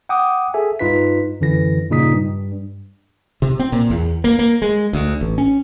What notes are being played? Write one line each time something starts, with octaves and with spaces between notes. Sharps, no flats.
F#5 G5 D6 D#6
G#4 A4 E5 G#5
G2 D#4 F4 B4 B6
F#2 D3 E3 A#6
G2 A#2 C#3 D#4 D#6 B6
G2
C3
C4
A#2
E2
A#3
A#3
G#3
D2
A1
C#4